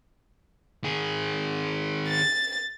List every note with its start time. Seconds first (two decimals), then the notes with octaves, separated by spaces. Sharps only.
0.84 D#3 G#4
2.08 A6